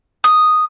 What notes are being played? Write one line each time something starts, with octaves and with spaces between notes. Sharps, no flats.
D#6